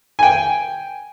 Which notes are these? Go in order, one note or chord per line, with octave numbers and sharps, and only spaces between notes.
G5 G#5